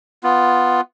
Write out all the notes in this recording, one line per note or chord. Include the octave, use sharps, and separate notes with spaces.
B3 F4